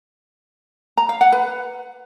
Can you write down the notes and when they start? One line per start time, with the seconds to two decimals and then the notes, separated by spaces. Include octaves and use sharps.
0.97 A#5
1.09 F5
1.21 F#5
1.32 B4